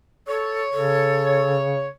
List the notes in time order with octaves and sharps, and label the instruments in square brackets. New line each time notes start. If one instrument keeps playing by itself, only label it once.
[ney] A4 [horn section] C#5
[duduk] C#3 [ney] A4